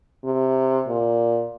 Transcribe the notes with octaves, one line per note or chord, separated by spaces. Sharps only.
C3
A#2